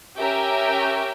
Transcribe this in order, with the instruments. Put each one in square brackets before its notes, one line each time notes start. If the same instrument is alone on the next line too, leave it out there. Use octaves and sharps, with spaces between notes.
[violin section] C#4 G4 A#4 E5 G5